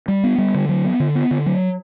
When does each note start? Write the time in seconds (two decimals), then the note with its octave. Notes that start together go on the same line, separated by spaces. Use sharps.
0.08 G3
0.24 B3
0.38 G3
0.54 D3
0.69 F#3
0.85 B3
1.00 D3
1.15 B3
1.31 D3
1.46 F#3